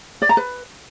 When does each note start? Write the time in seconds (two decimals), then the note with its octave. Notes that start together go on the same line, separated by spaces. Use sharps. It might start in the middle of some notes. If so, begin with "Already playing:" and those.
0.22 D5
0.29 A#5
0.37 B4